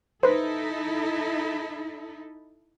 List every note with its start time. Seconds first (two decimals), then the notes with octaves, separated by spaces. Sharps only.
0.23 D#4 E4 A4 B4 C5